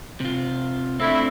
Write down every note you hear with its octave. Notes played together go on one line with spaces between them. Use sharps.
C3 F4
A3 C4 D4 E4